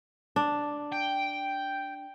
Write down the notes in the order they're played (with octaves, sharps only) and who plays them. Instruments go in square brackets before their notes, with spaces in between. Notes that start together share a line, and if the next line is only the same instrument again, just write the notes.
[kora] D4
[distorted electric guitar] G5